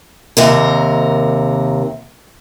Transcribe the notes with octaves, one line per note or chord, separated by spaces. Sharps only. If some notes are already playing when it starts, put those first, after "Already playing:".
D#2 C3 A#4